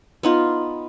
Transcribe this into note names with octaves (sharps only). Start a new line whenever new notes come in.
B3 D#4 F4